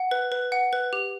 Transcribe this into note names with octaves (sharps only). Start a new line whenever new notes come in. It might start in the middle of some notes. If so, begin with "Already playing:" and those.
Already playing: F#5
B4
B4
F#5
B4
G4